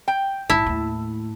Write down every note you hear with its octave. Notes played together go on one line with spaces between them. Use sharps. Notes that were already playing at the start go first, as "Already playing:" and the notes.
G5
A#1 G#2 E4 A5
D#2 A2